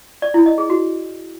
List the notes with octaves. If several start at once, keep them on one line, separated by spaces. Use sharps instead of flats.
D5
E4
D#5
G#4
F#4